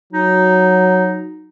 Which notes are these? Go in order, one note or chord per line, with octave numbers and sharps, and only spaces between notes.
F#3 D#4